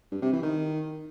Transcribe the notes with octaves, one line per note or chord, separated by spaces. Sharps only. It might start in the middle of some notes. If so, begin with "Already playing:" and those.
G2
C3
E3
D#3